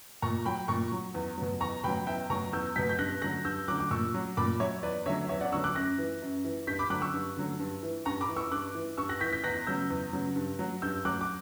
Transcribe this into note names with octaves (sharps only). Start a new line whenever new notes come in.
A#2 A#5 C#6
F#3 G5 B5
A#2 A#5 C#6
F#3
E2
B2 F#3
E2 A#5 C#6
B2 F#3 G5 B5
E2 E5 G5
B2 F#3 A#5 C#6
E2 E6 G6
B2 F#3 G6 B6
G6
G2 F#6 A#6
D3 F#3 F#6 A#6
G2 E6 G6
D3 F#3 D6 F#6
D6
A#2 C#6 E6
F#3
A#2 B5 D6
F#3 C#5 E5
E2 B4 D5
D3 F#3 C#5 E5
E2 C#5 E5
D5 F#5
D3 F#3 C#6 E6
D6 F#6
F#2 F#6 A#6
E3
F#2
E3
G2 G6 B6
B5 D6
D3 F#3 D6 F#6
C#6 E6
G2
D3 F#3
G2
E3
G2 A#5 C#6
B5 D6
E3
C#6 E6
G2 D6 F#6
E3
G2 C#6 E6
F#6 A#6
E3 G6 B6
G6 B6
E2 F#6 A#6
C#3 F#3 E6 G6
E2
C#3 F#3
G2
F#3
G2 E6 G6
F#3 D6 F#6
D6